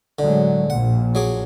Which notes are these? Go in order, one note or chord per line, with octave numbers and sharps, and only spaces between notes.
A2 D3 F#3 G#3
A#1 A#2 F#5
F#3 G#4 D6